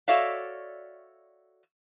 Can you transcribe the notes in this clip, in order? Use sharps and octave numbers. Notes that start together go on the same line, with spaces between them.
F#4 A4 C#5 D5 E5 F5